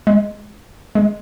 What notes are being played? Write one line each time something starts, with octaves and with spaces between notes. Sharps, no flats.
G#3
G#3